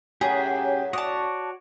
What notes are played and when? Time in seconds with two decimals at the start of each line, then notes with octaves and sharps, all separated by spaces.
0.21 F#2 A2 F#3 C#4 G4 G#4
0.93 F#4 C#5 D5 A5 D#6